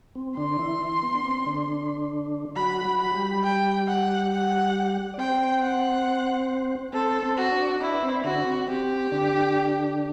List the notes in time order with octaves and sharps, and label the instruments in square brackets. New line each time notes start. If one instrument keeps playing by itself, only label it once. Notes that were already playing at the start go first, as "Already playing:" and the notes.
[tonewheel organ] C4
[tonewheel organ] D3 D4 [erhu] C6
[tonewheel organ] E3 E4
B3
D4
C4
D3 D4
[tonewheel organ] F#3 F#4 [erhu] B5
[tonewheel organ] F#3 F#4
[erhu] B5
[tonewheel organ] G3 G4
[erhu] G5
F#5
F#5
[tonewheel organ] D5
[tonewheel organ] C4 C5 [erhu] G5
[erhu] F#5
[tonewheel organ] C4 C5 [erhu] A4
[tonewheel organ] C4 C5
[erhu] F#4
[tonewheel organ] D4 D5
[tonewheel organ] D4 D5 [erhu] E4
[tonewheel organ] B4
C4 C5
[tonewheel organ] D3 D4 [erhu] F#4
[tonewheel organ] D4
C4
[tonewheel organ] C4 [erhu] G4
[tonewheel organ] D3 D4